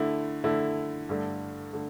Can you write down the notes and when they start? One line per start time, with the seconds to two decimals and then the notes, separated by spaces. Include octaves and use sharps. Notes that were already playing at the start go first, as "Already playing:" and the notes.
Already playing: D3 A3 E4
0.44 D3 A3 E4
1.09 G2 D3 A3
1.73 D3 A3